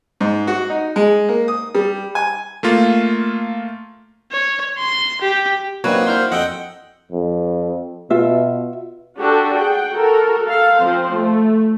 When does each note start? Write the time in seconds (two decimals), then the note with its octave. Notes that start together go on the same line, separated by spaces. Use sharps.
0.21 G#2
0.47 F#4
0.70 D#4
0.96 G#3
1.29 A#3
1.48 D#6
1.75 G3
2.15 G#5
2.63 A3 A#3 F4
4.32 C#5
4.78 C6
5.21 G4
5.84 F#3 A#3 C4 D4 D#4 F#4 B4 C#5
6.07 D4 E4 C5 C6 F6 G6
6.32 F2 D#5 F#5 G5 E6 G7
7.11 F2
8.10 B2 F4 E5
9.17 D4 F#4 G4 A4
9.55 G#4 F#5 G5
9.93 F#4 A4 A#4
10.45 A4 F5
10.79 F3 C4 C5
11.14 A3